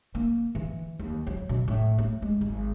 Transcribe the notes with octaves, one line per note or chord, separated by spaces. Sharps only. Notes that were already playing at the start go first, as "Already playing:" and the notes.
A#3
E3
D#2
F#3
B2
A2
A3
G#3
G#1